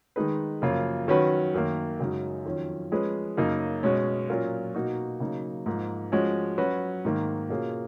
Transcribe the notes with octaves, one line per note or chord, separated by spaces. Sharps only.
D#3 G#3 D#4 G#4 B4
F#2 C#3 F3 A#3 F4
D#3 F#3 C#4 F#4 B4
F#2 D#3 A#3
F#2 C#3 G#3 D#4 F#4
F2 D#3 F#3 C#4
F3 G#3 C#4 G#4 B4
F#2 C#3 F#3 A#3 D#4
B2 G#3 C#4
A#2 F#3 C#4 F4 A#4
B2 A#3 D#4 F#4
C#3 F#3 A#3 D#4
G#2 F3 A#3
F3 G#3 C#4 F#4
F#3 C#4 F#4 B4
G#2 D#3 A#3
B2 A#3 C#4 F4 G#4